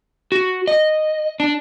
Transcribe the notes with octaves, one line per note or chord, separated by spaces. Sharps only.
F#4
D#5
D4